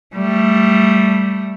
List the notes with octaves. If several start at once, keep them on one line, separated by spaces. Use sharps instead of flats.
G3 A3